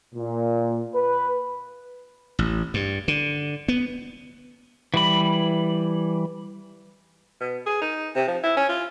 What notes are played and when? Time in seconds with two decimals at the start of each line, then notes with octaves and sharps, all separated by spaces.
0.14 A#2
0.95 B4
2.39 A1
2.74 G2
3.08 D3
3.68 B3
4.94 E3 G3 B5
7.40 B2
7.66 G#4
7.81 D#4
8.16 C3
8.28 F3
8.43 E4
8.57 C#4
8.69 F4